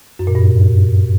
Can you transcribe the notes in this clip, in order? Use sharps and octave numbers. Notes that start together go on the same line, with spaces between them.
F#2
A#2
G2